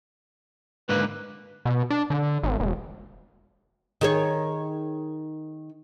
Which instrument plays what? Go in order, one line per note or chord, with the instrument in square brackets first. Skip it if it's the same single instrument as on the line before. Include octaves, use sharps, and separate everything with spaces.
[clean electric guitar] G#2 D3 A#3 [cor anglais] B4
[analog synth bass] B2
D4
D3
G#1
E1
[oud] D#3 G#4 C#5